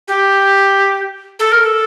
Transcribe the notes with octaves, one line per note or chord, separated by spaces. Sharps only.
G4
A4
A#4
A4